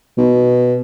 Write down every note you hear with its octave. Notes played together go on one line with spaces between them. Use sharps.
B2